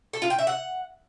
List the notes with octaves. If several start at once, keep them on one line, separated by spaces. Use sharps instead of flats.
A4
F4
G5
E5
F#5